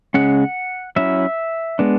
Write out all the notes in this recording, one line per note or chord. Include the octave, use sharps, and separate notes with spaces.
C#3 G#3 C#4 F#5
F#3 C#4 E4 E5
G#3 B3 D4